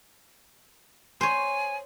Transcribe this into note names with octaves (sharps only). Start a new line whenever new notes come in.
C5 C#5 G#5